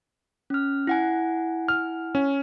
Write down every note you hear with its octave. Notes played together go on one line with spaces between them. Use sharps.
C#4 F6
E4 F#5 G#5
F6
C#4